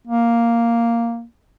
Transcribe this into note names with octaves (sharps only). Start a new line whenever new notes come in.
A#3